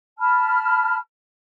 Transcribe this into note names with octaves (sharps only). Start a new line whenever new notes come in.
A5 B5 F6